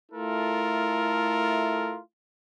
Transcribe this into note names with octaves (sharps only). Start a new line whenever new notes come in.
A3 E4 F4 A4 A#4